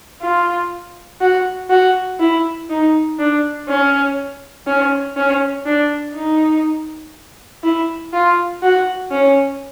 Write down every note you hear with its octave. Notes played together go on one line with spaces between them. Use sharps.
F4
F#4
F#4
E4
D#4
D4
C#4
C#4
C#4
D4
D#4
E4
F4
F#4
C#4